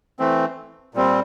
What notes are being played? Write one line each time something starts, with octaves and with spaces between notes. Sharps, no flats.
E3 A3 C4
A#2 G3 C4